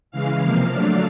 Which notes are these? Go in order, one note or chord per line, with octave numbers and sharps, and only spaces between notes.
C#3 E3 G#3 F5
C3 F3 A#3
D3 F#3 A3 D4